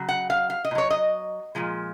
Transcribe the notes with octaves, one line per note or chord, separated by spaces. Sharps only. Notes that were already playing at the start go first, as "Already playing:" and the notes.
Already playing: C#3 F#3
F#5
F5
F5
D#5
A#2
F#3 C#5
D#5
A#2 F3 G#3